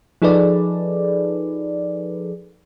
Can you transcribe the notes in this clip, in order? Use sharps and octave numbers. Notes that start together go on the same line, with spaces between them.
F3 D#4 G#4 A4 B4 D5